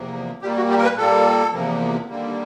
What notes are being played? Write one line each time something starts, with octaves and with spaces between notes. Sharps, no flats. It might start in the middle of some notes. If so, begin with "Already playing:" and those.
Already playing: E2 C3 F3 A#3
A#2 G3 A#3 G4
F#4
G4
A#4
B4
A#2 G3 A#3 A4
E2 C3 F3 A#3
D#2 D3 G3 A#3